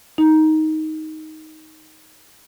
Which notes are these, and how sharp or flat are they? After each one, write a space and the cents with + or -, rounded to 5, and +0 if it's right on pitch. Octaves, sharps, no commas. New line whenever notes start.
D#4 +10